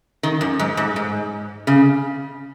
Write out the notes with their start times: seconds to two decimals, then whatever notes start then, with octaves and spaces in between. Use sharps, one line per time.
0.23 D#3
0.41 F#2
0.59 G#2
0.77 G#2
0.96 G#2
1.67 C#3